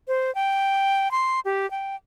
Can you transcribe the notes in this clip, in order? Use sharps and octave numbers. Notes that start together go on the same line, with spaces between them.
C5
G5
C6
G4
G5